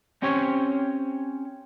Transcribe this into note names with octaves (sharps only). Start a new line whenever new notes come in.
C4 C#4 G4 C5 C#5